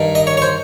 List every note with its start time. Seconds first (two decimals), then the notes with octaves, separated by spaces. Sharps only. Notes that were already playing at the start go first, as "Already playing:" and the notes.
Already playing: G2 D#3
0.15 D#5
0.27 C#5
0.37 C#5
0.42 C5